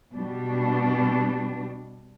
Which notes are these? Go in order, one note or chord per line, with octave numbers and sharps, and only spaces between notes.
B2 G3 D4